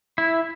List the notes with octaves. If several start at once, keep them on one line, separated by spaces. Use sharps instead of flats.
E4